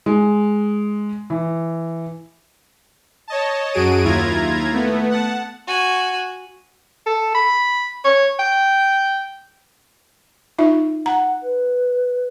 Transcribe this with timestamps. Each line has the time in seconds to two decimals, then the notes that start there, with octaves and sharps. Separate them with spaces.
0.06 G#3
1.30 E3
3.28 C#5 D#5 A5
3.73 F#2 F#3 F#4 G#4 D7 D#7
4.04 D#2 E4 F4 A#5 G#6
4.73 A3 B3
5.11 F#5 A5
5.68 F#4 G#5
7.06 A4
7.35 B5
8.05 C#5
8.39 G5
10.58 D#4 F4 E5
11.06 F#5 A#5
11.42 B4